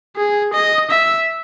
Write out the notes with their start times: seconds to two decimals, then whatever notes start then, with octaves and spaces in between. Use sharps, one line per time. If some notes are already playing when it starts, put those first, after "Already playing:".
0.16 G#4
0.53 D#5
0.90 E5